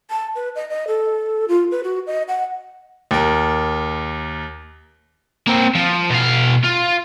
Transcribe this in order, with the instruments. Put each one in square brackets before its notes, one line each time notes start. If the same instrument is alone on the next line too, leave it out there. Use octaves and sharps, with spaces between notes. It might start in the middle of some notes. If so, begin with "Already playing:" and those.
[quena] A5
B4
D#5
D#5
A4
F4
B4
F#4
D#5
F#5
[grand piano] D#2 A#4
[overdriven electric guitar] A#3 C4
F3
B2 F5
F4